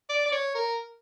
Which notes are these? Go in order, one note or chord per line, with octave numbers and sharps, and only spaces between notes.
D5
D5
C#5
A#4